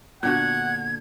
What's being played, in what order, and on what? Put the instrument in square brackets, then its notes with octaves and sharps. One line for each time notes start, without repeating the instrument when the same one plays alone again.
[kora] A#2 D3 F#4 [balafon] B3 [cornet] F#5 [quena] G#6